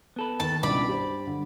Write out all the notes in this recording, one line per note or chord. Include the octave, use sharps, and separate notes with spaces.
B3 A4 B4
D#2 A5
C#2 G2 B2 E4 D5 B5
G4 C5
D3